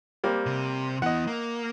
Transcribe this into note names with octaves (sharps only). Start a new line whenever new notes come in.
G3 A#3 C4
C3
E3 B3 D#5 F#5
A#3